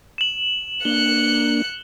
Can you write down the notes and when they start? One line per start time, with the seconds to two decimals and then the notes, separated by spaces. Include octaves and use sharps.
0.18 E7 F#7
0.85 A#3 D4 F#6 C#7 G7